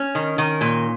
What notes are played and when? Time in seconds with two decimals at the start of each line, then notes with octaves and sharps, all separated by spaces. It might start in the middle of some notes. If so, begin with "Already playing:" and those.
Already playing: C#4
0.15 D#3
0.38 D#3
0.61 A#2